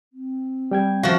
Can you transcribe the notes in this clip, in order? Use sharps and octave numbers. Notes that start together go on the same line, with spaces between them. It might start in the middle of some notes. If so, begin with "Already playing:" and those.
C4
G3 G5 G#6
F3 C#4 F#4 E5 F5